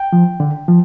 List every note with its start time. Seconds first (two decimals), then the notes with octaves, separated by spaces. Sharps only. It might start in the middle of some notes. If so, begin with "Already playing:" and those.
Already playing: G5
0.13 F3
0.40 D3
0.68 F3